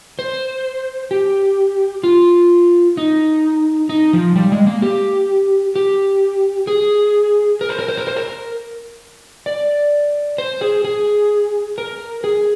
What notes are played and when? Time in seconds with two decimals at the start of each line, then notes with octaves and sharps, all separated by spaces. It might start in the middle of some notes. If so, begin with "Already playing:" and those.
0.19 C5
1.11 G4
2.03 F4
2.97 D#4
3.89 D#4
4.13 F3
4.36 G3
4.52 G#3
4.67 A#3
4.82 G4
5.76 G4
6.67 G#4
7.61 A#4
7.69 C5
7.79 A#4
7.88 C5
7.97 A#4
8.07 C5
8.16 A#4
9.46 D5
10.38 C5
10.61 G#4
10.84 G#4
11.78 A#4
12.24 G#4